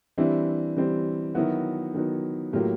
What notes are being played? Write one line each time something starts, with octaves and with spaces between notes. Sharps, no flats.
E3 G3 C4 D4 E4
E3 G3 C4
D#3 F#3 B3 E4 F#4
D#3 F#3 B3
A2 F#3 A#3 F4 G4